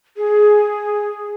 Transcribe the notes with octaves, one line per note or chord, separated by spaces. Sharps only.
G#4